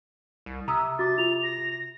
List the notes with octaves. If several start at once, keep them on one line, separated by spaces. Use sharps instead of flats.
C2
C3 A#5 D#6 E6
F#4 D6 A6
F4 F7
A#6